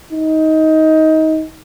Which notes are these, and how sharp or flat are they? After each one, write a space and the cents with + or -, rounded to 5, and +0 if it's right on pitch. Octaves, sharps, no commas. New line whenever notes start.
D#4 +20